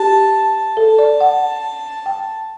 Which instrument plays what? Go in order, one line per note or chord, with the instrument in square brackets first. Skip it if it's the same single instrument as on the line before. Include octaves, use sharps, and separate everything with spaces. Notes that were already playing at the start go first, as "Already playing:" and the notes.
Already playing: [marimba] G4 [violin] A5
[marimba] A4 [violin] A5
[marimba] D5
F#5
G5